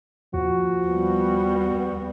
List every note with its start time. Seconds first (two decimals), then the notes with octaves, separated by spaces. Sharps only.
0.34 D#2 F3 F#4
0.88 G3 B3